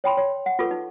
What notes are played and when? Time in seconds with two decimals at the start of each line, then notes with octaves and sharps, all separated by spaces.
0.04 C#5 G5 B5 C6
0.17 C#5
0.46 F#5
0.59 F4 G#4 A4 B4 C#6
0.71 D#4